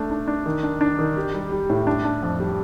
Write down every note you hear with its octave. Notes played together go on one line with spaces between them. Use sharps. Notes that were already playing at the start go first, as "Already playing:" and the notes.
Already playing: A3 D4
D4
D4
D#3
D4
D4
D#3
G4
G3
G3
A2
D4
D4
F2
G3